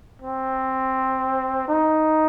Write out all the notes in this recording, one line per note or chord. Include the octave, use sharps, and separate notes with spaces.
C4
D#4